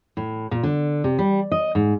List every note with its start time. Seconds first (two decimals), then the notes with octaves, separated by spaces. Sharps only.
0.17 A2
0.51 A#2
0.63 D3
1.04 C3
1.19 G3
1.52 D#5
1.75 G#2